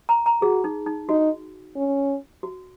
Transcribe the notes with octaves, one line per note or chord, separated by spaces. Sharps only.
A#5
A#5
F#4 G#4
D#4
D#4
D#4 F#4
C#4
F#4